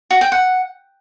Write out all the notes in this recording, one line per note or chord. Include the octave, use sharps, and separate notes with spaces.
F#4
G5
F#5